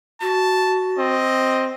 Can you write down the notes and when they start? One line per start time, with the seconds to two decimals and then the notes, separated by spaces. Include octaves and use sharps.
0.21 F#4 A5
0.98 C4 D#5